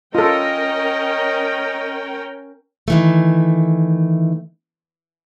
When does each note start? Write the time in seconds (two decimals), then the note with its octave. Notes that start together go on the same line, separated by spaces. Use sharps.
0.15 C#4 F4 A4 A#4 D#5 G5
2.88 D#3 E3 A3